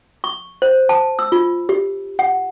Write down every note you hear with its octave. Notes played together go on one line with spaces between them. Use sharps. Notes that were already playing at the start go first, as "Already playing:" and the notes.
C#6
C5
A5
E6
F4
G4
F#5